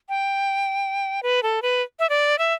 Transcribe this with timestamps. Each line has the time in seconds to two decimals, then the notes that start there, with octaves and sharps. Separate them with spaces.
0.09 G5
1.23 B4
1.43 A4
1.62 B4
1.99 E5
2.10 D5
2.39 E5